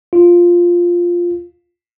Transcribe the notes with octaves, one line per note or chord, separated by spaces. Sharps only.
F4